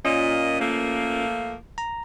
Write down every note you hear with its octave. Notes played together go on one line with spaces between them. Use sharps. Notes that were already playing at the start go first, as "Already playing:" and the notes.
A#2 C#4 F4 D#5
F3 A3 A#3
A#5